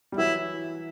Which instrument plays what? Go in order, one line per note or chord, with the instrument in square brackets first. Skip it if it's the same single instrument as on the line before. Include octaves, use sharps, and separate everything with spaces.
[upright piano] G3
[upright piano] E3 F#3 [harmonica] E4